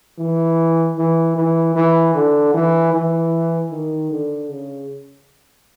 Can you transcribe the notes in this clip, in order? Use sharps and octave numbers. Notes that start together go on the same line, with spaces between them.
E3
E3
E3
E3
D3
E3
E3
D#3
D3
C#3